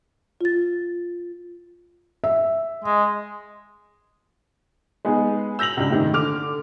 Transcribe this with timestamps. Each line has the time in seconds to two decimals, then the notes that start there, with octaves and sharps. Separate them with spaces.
0.41 F4 A6
2.24 E5
2.84 G#3
5.05 G#3 B3 D#4 G#4
5.59 E6 G6 A#6 F7 F#7
5.77 C#2 G2
5.90 A2 C3 D#3
6.14 D3 D6 F6 F7